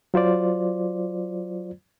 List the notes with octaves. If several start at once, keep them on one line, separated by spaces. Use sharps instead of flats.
F#3 F4 C5 D5